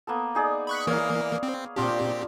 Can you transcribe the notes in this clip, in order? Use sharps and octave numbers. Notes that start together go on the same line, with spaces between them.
A#3 B3 A4
D#4 G#4 D5
B5 C#6 F#6
E3 A#3 A#4 C#5 D5 F5
C4
A#2 C4 D4 F4 G4